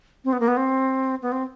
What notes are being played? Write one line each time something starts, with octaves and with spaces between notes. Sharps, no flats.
C4
B3
A#3
B3
C4
B3
C4